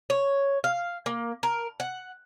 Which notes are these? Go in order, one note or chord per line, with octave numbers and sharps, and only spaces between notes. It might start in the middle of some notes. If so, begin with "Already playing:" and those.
C#5
F5
A#3
A#4
F#5